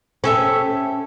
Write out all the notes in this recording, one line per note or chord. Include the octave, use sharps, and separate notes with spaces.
C#4 G4 A4 E5